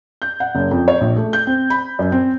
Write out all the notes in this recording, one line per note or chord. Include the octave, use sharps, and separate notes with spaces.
G6
F#5
F#1
F2
C#5
A#1
A3
G6
C4
B5
F#2
C4